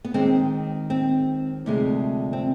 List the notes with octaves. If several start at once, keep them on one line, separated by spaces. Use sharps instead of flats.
B3
D#2 D#3 G#3 C4
C4
D2 C3 F3 G#3
C4